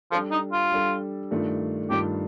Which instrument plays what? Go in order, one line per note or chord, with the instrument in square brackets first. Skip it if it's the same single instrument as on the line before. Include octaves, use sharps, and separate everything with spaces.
[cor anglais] F3 [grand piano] G3 D4 A4
[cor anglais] D#4
F4
[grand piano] G3 D4 A4
G2 D#3 A3 D4 F4
[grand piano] G2 D#3 A3 D4 F4 [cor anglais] G4